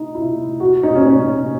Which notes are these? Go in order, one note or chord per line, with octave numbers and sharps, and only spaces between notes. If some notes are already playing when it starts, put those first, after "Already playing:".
Already playing: D#4
E4
F#4
D#4
C#4
C#4